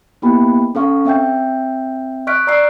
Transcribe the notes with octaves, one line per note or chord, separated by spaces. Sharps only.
A#3 B3 E4 G4 G5 B5
C#4 A4 F5 C#6
C4 E5 G5 G6
D#5 C#6 F6 F#6 B6 D7
D5 A#5 E6 C7 D7